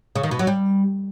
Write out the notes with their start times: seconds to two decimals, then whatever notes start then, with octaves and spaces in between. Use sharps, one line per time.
0.16 C#3
0.23 D#3
0.31 B2
0.39 F#3
0.47 G3